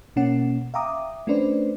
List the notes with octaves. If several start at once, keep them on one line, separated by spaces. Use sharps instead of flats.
B2 A#3 C#4 F#5
E5 F5 G5 A#5 D6 D#6
A3 C#4 D4 B4 C5 D5